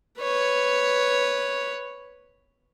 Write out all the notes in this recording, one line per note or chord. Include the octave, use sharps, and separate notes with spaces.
B4 C#5